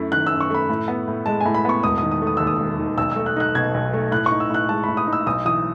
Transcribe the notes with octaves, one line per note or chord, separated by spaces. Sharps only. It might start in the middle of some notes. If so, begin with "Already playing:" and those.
Already playing: F#2 A3 E4
D#3 F#6
E6
F#2
C#6
A3 B5
A2
B3
A2
G#3 A5
G#5
A2
B5
B3 C#6
E1 D#6
D#6
D#3
D#6
A3
D#6
D#2 E6
D#6
E1
D#3
B1 E6
E6
A3
F#6
D#4 F#6
B2 G#6
B1
A3
A2 F#6
C#6
D#4
E6
A2 F#6
G#3 A5
B5
A2
D#6
D#4
E6
B1 D#6
E3 D#6